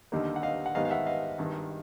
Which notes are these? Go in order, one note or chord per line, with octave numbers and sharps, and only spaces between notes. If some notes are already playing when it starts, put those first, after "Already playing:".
D#2 D3 G3 A#3 D#4
F#5
D#5 F5
F#5
G#2 D#3 G3 B3 D#5 F5
F5
E5 F#5
D#5 F5
G#1 G2 D#3